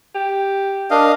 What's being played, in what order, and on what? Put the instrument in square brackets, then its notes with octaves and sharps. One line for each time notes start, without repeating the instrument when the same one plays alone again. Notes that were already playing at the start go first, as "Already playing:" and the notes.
[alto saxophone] G4
[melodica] D4 [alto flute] A#4 [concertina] D#5 F5